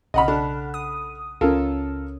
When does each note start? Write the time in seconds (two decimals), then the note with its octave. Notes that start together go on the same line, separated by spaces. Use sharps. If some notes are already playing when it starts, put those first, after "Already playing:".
0.14 B1 C#3 D#5 F#5 B5 F6
0.28 D4 A4 F#5 B5
0.74 D#6
1.41 C#2 C#4 F4 A4 A#4